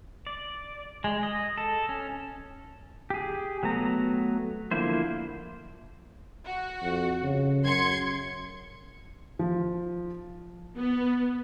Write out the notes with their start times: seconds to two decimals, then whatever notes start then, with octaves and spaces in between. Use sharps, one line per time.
0.27 D5
1.04 G#3
1.23 D#5
1.58 A4
1.89 C#4
3.10 G4 G#4
3.63 F#3 A3 B3 A#5
4.71 D3 F3 A#3 E4 C5
6.44 F#4
6.82 F2
7.23 C#3
7.64 F#2 C6 G#6 C#7
9.39 F3
10.78 B3